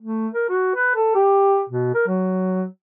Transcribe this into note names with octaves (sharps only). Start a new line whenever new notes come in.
A3
A#4
F#4
B4
A4
G4
B2
A#4
F#3